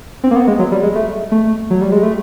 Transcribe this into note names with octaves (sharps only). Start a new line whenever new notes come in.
C4
A#3
B3
G#3
F#3
G3
G#3
A3
A3
F#3
G3
G#3
A3